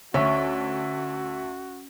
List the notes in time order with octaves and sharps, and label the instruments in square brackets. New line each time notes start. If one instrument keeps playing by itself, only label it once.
[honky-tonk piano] D2 [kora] C#4 [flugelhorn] F#4 [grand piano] E5